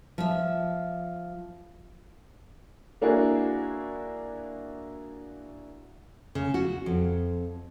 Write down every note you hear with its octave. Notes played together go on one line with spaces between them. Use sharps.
F3 E5
A#3 D4 E4 F#4 G#4
C#3
F#4
F2